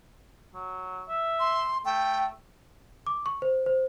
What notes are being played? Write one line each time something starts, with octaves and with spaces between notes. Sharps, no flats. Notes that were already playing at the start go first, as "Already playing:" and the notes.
F#3
E5
C6
A3 G5
D6
C#6
C5
C5